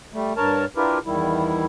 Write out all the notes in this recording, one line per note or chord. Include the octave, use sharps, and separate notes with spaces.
G3 A3
G2 A#4 C#5 A5
D4 E4 F4 G4 A#4 B4
E2 D#3 G3 E4